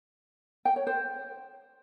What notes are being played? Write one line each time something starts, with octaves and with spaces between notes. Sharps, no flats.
G5
C#5
C5